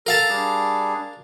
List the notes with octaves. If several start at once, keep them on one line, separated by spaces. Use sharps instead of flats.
A4 A#4 F5 A5
G3 D4 G#4